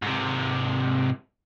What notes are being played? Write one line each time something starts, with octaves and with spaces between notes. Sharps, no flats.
G#2 C3